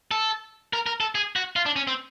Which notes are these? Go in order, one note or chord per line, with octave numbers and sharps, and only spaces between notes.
A4
A#4
A#4
A4
G#4
F#4
F4
D4
C#4
C4